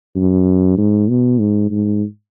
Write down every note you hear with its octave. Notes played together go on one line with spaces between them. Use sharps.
F#2
G#2
B2
G#2
G#2